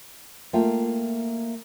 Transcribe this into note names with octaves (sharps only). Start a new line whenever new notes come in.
A3 A#3 F4 G5